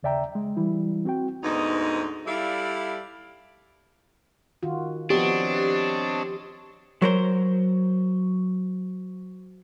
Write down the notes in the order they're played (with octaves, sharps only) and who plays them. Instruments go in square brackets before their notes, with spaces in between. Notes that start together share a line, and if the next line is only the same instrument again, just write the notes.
[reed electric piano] D#2 C#3 D5 E5 G5 A#5
G#3
E3 G3 E4
C4 F#4 G5
[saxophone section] D2 G#2 B3 D#4
G3 E4 A4 D5 E5 F5
[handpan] D#3 F4 F#4
[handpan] F3 B3 F#4 [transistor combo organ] C4 C#5 D#5 [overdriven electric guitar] D4 [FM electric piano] G4
[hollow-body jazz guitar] F#3 A#4 C5